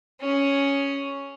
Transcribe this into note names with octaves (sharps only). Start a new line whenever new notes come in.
C#4 G#4